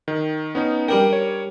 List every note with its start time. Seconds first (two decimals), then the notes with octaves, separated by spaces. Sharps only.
0.08 D#3
0.55 B3 C#4 D#4
0.88 G3 D4 A#4 G5
1.13 C#5